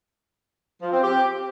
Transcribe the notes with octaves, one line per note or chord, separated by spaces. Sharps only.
F3
C4
G4